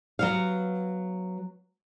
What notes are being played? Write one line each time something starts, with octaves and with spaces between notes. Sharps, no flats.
F#3 B3 F5